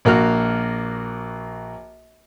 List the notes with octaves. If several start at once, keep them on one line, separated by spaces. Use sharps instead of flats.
A#1 A#3 F#4 F6